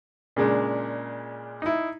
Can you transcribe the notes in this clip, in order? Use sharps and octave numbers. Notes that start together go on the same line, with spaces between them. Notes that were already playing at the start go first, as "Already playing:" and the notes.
A#2 C#3 G#3 D4
D#4 E4